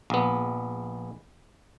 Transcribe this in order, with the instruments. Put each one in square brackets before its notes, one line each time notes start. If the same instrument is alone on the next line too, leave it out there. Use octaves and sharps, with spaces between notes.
[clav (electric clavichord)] A#1 B3